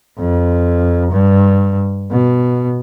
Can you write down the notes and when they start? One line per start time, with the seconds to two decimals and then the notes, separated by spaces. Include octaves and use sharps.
0.18 F2
1.11 G2
2.11 B2